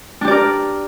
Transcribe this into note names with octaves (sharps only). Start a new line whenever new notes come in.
D4 G4 A#4 D5